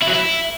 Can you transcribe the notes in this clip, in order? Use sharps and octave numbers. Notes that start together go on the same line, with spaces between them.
E4
F#3
E4